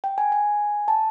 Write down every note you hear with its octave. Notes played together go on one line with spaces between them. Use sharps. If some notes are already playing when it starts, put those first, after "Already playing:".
G5
G#5
G#5
A5